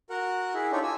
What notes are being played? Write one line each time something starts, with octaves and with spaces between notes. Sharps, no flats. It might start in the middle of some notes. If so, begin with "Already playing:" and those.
F#4 A#4 F#5
E4 G#4
D4 D#4 F4 G4 A4 C#5
G#5 E6